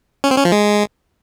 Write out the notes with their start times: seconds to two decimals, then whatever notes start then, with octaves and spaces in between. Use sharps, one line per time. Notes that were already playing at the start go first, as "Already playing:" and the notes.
0.24 C#4
0.31 C4
0.38 C#4
0.45 F3
0.52 G#3